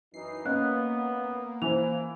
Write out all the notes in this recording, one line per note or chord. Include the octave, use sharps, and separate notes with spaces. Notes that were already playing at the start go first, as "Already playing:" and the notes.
F#2 E3 D#4 C7
A#3 B3 C#4 D#5 F5 F#6
E3 C5 G#5 F7